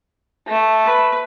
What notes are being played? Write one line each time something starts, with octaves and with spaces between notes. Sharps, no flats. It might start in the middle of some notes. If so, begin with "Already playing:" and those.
A3
B4